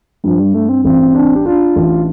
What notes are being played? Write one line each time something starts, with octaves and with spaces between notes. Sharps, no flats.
G2 F3
G3
G2 A3
C4
A1 C4
D4
G4
D4 F4
A1